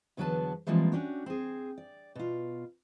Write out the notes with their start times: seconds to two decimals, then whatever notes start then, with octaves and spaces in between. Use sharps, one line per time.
0.17 E2 D3 F#3 B3 B4 A5
0.67 E3 F3 G3 G#3 A#3 C4
0.92 C#4 D4 F#4 G4
1.26 C4 G#4
1.78 D5
2.15 B2 F4